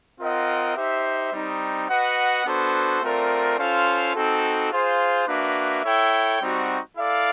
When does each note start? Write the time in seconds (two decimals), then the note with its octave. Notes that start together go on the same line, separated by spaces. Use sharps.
0.20 C4 F4 A#4 D#5 F#5
0.76 D#4 G4 C5 E5
1.33 G3 C4 D#4
1.89 F#4 B4 D#5 F#5
2.45 B3 D4 F#4 A4 C5
3.02 A3 C4 F4 A#4 D5
3.58 C#4 F4 A4 C5 F5
4.15 C4 D#4 F#4 A4
4.72 F4 G#4 C5 F5
5.28 A#3 D4 F#4 B4 E5
5.84 E4 A4 C#5 E5 G5
6.41 G3 C4 D#4 F#4
6.97 E4 A4 D5 F5